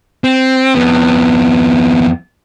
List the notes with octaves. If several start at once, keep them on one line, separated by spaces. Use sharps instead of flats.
C4
F2 B3